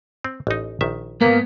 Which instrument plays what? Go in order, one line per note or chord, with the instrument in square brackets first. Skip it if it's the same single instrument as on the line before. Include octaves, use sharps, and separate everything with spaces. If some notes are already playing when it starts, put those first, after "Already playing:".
[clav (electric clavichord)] C4
A1 D#4
A#1 D#3 E5
[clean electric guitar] G#2 B3 [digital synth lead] A#3